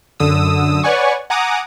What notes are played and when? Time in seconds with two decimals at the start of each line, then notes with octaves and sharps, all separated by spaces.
0.20 F#2 D3 D#6 E6
0.84 B4 C#5 D5 F#5 G#5 C#6
1.30 F#5 G#5 A#5 D6 D#6